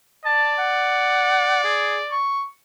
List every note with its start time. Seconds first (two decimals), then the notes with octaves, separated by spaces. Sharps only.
0.26 D5 A5
0.59 F#5
1.64 G#4
2.11 C#6